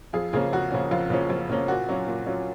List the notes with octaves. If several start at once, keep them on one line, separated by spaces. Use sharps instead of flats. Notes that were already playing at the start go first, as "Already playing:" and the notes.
F2 F4 G#4
C#3 F3 A#3 C#4 F4 G#4
F2 F#4
C#3 F3 A#3 C#4
F2 F4
C#3 F3 A#3 C#4
F2
C#3 F3 A#3 C#4
A#2 F#4
F#3 C#4 F4
A#2
F#3 C#4 F4